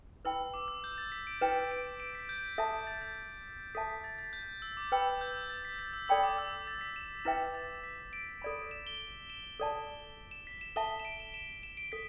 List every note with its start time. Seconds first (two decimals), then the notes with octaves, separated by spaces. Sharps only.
0.25 E4 B4 G5 B5 E6
0.54 D6
0.68 E6
0.84 G6
0.98 A6
1.12 B6
1.27 D7
1.41 E4 B4 G5 E7
1.71 D7
2.00 D7
2.15 B6
2.29 G6
2.58 A4 E5 A5
2.87 A6
3.02 A6
3.75 A4 E5 A5 B6
3.90 B6
4.04 A6
4.19 A6
4.33 G6
4.62 E6
4.77 D6
4.92 B4 G5 B5 E6
5.21 G6
5.50 A6
5.65 B6
5.79 A6
5.94 E6
6.08 A4 D5 G5 B5 E6
6.23 D6
6.38 E6
6.67 A6
6.81 B6
6.96 E7
7.25 E4 B4 E5 G5 E7
7.54 A6
7.84 B6
8.13 D7
8.42 A4 D5 B5
8.71 E7
8.87 G7
9.30 E7
9.60 A4 D5 A5
10.31 E7
10.47 B6
10.61 E7
10.76 A4 E5 A5 G7
11.00 E7
11.05 D7
11.20 E7
11.34 E7
11.63 E7
11.77 D7
11.92 A4 B6